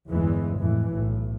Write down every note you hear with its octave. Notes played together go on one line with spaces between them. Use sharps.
G1 E2 E3 G#3
F2 A2 E3
B1 A2